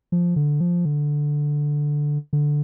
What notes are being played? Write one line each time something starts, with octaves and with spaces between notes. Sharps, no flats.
F3
D3
F3
D3
D3